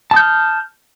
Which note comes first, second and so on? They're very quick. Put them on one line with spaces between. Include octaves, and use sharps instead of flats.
A5 D#6 G6 F6